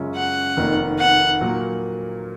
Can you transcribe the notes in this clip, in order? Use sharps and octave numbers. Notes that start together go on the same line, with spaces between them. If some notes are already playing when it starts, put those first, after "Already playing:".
Already playing: F#2 C#3 G#3 C#4 F4
F#5
F1 F2 D#3 A#3
F#5
A#2 F#3 A#3